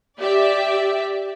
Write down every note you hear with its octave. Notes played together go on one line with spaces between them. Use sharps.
G4 D5 E5